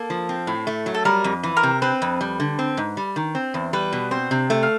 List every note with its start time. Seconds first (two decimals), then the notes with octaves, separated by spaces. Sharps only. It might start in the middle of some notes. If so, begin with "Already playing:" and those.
Already playing: A#3 A4
0.10 F3
0.29 C4
0.47 A2
0.67 A3
0.86 F#3
0.94 A4
1.05 G3 A#4
1.24 F2
1.43 E3
1.57 A#4
1.63 C3
1.82 C4 B4
2.02 F2
2.21 G3
2.40 D3
2.59 C4
2.77 G#2
2.97 G3
3.16 D#3
3.35 C4
3.54 E2
3.73 G3 B4
3.93 B2
4.11 C4 C5
4.31 C3
4.50 A3
4.63 F5